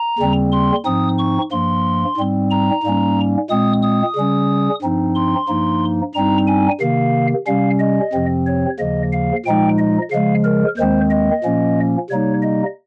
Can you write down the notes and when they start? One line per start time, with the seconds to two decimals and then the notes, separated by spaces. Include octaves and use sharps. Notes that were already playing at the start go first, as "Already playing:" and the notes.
Already playing: A#5
0.19 D#2 C#3 G3 C4
0.52 C6
0.85 G#2 F3 C4 D#4 D#6
1.18 C#6
1.51 G2 F3 A#3 C6
2.17 G#2 G3 C4
2.50 A#5
2.83 G#2 G3 A#3 C#4
3.49 A#2 G#3 C4 D#6
3.82 D#6
4.16 C#3 G3 C#4
4.82 G2 F3 C4 D#4
5.15 C6
5.48 G2 F3 A#3 D#4
6.14 G2 G3 C4 D#4 A#5
6.47 G#5
6.80 C3 D#3 A#3 F5
7.46 C3 G3 C#4 F5
7.80 D#5
8.13 F2 C3 F3 C4
8.46 C#5
8.79 D#2 C#3 F3 A#3 D#5
9.12 F5
9.45 A#2 F3 G#3 D#4 G5
9.79 D#5
10.11 C#3 F3 G#3 F5
10.44 A#4
10.77 D#2 D#3 G#3 C4 C5
11.11 D#5
11.44 A#2 F3 A#3 C#4
12.10 C3 G3 A#3 D#4 C#5
12.43 D#5